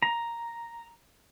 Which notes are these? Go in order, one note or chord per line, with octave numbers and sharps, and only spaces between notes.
A#5